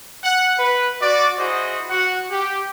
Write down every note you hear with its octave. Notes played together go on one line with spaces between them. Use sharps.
F#5
B4
F#4 D5
E4 F#4 G#4 C5 D#5
F#4 F#5
G4